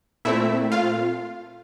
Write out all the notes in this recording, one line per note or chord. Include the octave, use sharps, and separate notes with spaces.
A#2 A3 C4 E4 E5
F4 F5